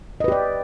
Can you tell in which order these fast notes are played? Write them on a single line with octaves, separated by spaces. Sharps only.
D#5 B4 G4 D5